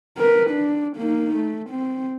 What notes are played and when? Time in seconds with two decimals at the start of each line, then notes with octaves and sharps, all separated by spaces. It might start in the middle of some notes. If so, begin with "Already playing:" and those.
0.18 A#4 B4
0.50 D4
0.97 A#3 D#4
1.36 A3
1.69 C4